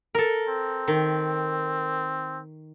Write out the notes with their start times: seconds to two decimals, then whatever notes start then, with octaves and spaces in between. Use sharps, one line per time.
0.15 A4 A#4
0.49 C4
0.88 D#3